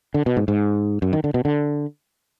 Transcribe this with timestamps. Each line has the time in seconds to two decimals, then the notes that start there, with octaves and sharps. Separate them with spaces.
0.14 D3
0.26 B2
0.37 G#2
0.48 G#2
1.02 F#2
1.13 D#3
1.24 D3
1.34 B2
1.45 D3